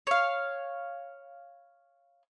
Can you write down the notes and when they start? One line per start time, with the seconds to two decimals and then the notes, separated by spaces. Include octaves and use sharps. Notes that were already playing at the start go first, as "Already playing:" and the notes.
0.07 C#5 F5